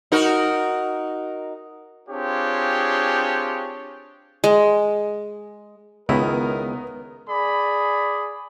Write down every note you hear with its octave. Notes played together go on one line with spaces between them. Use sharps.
D#4 F#4 A#4
C4 D4 F4 G4 G#4 C#5
G#3
C#2 D#3 B3 E4 A#4
G#4 D5 B5